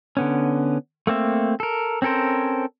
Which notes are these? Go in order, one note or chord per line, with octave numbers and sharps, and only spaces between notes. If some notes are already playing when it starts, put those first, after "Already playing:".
D3 B3 C#4
A3 A#3 C4 E5
A4 A#4
C4 C#4 A4 A#4 C5